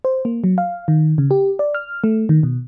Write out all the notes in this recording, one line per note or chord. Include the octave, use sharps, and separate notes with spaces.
C5
A#3
F#3
F5
D#3
C#3
G4
D5
F6
A3
D#3
B2